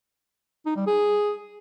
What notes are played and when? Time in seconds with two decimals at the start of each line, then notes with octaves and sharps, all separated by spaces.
0.66 D#4
0.76 G3
0.87 G#4